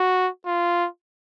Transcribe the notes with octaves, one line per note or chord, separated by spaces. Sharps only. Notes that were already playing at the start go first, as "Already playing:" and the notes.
Already playing: F#4
F4